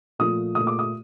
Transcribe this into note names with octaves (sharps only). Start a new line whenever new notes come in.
A#2 F3 A3 D#6
A#2 A3 D#6
D6
D#6